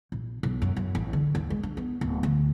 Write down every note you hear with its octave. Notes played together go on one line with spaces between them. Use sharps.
A#1
B1
F#2
F#2
A1
D3
D#2
G#3
D4
B3
D1
D2